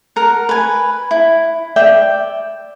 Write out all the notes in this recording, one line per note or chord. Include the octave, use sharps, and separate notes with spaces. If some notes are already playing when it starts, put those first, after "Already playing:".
A#4 F#5
B4 G#5
E4
D5 E5 G5